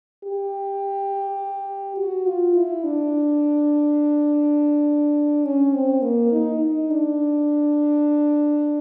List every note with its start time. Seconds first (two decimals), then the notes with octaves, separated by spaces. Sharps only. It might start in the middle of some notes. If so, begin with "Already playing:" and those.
0.24 G4
1.97 F#4
2.26 F4
2.55 E4
2.84 D4
5.45 C#4
5.73 C4
6.02 A#3
6.32 D#4
6.61 D#4
6.90 D4